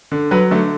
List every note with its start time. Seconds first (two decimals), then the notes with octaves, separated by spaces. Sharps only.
0.12 D3
0.31 F#3 B4
0.51 D3 A3